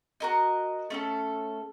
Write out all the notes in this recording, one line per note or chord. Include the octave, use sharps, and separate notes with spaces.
F#4 A#4 D#5
A3 C#4 A4